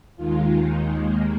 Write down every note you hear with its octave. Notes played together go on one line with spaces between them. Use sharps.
D#2 D#3 G#3 F4
D#4
A#3